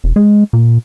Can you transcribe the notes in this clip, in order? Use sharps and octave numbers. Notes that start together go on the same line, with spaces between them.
E1
G#3
A#2